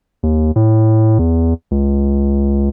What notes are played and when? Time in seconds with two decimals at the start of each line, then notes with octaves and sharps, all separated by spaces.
0.23 D#2
0.56 A2
1.19 E2
1.71 C#2